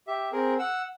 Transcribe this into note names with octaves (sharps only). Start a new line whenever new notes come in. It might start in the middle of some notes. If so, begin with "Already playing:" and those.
G4 E5
C4 G#4 A#4
F#5 E6